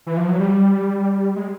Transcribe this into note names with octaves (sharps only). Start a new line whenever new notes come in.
E3
F3
F#3
G3
G#3